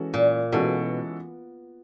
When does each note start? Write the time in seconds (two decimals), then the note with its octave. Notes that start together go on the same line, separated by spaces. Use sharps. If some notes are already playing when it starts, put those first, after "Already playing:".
Already playing: E3 G#3 C#4 F#4 A4
0.14 A#2
0.52 B2 E3 G#3 C#4 F#4 A4